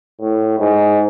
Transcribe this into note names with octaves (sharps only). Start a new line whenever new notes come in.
A2
G#2